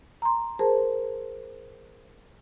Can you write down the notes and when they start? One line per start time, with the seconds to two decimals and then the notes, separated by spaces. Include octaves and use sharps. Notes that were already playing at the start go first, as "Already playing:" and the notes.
0.22 A#5 C6
0.59 G#4 A#4 C5 A5